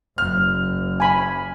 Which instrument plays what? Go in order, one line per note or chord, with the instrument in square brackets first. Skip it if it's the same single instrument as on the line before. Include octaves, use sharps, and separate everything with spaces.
[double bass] F#1 [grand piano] F6
[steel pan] G#5 B5